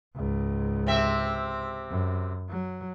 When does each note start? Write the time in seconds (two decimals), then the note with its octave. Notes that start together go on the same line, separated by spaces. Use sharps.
0.15 C#2 G#2
0.87 C3 C4 E5
1.90 F#2
2.49 F#3